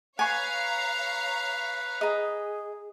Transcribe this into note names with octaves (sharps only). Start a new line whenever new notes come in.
B4 C#5 F5 G#5 A#5 C#6
G#4 D#5 A#5